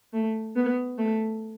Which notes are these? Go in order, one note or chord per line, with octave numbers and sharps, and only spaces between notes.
A3
B3
A3